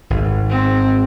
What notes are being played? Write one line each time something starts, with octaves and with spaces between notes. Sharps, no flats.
G#1
C4